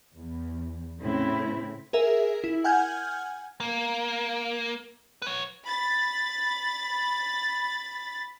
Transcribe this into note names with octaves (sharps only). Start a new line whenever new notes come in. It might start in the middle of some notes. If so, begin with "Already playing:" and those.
E2
A2 C#3 C4 E4
G#4 A#4 E5
E4
F#5 G#5 F6 G6 G#6
A#3
B4 C#5
B5 A6